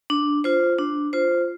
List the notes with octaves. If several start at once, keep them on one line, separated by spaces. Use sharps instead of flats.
D4
F4 C5
D4
F4 C5